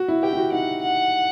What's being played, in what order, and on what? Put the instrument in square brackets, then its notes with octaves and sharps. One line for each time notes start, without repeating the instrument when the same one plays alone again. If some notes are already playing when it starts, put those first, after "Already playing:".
Already playing: [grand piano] F#4
E4
[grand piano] G4 [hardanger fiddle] G5
[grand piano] E4
F#4
[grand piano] D#4 [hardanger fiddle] F#5
[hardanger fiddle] F#5